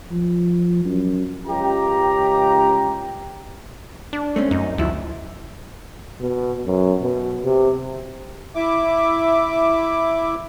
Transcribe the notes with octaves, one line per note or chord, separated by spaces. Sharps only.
F3
F#2
C#2 G4 A#5
D4
A3 C4 C#4
F#2 D#4
D2 F3 F#3 E4
B2
F#2
B2
C3
E4 E5 D6